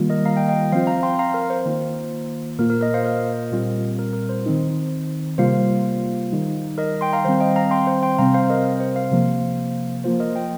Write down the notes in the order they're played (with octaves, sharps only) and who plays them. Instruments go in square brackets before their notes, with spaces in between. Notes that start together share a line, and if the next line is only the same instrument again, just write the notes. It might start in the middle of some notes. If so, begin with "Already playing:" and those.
Already playing: [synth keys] D#3 G3 A#3 F4
[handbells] A#4 D#5
F5 A#5
D#5 G5
D#5 G5
[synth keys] F3 C4 F4 [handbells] C5 F5
[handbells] F5 A#5
G5 C6
F5 A#5
A#4
C5
[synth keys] D#3 A#3 F4
[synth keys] A#2 A#3 F4 [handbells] A#4
[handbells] A#4
A#4 D#5
C5 F5
A#4 D#5
[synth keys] A#2 G3 C4 F4
[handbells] A#4
A#4
C5
[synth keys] D#3 C4 D#4
[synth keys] C3 G3 A#3 F4 [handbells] C5 F5
[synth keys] D#3 G3 D#4
[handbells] A#4 D#5
G5 C6
F5 A#5
[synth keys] D#3 G3 C4 [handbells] C5 F5
[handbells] D#5 G5
F5 A#5
G5 C6
C5
G5 C6
[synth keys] C3 G3 C4 [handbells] F5 A#5
[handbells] C5 F5
A#4 D#5
A#4
C5
C5 F5
[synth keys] C3 F3 A#3
[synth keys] F3 A#3 F4 [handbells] C5
[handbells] A#4 D#5
D#5 G5